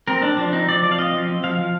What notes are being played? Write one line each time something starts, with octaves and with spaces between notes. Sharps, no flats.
C4 A#4
C4 D4
F3 D4
C4 D#4
F3 D5
F3 D5
F5
C4 D#5
F3
C4
F3 F5
F3